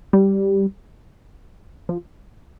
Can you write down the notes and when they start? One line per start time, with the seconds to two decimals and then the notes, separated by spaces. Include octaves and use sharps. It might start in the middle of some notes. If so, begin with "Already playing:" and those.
0.13 G3
1.89 F3